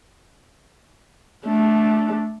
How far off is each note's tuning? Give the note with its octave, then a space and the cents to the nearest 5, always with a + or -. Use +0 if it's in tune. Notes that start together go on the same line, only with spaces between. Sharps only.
A3 -10 D4 +0